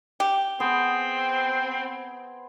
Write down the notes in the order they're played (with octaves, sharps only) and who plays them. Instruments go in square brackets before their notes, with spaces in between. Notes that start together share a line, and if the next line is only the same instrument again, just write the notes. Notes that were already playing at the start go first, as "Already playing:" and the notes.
[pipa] G4
[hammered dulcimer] B3 G#4 C5 [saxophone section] C4